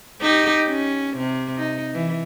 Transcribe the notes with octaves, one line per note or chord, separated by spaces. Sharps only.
D#4 G4
C#4
C3
D#4
E3